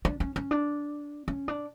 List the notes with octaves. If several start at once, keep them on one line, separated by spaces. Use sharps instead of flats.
D4
C#4
C#4
D4
C#4
D4